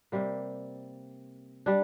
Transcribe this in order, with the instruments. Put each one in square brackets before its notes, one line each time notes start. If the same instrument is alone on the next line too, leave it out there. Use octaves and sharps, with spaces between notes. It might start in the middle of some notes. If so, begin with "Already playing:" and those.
[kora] C3 G3 A#3
G3 D4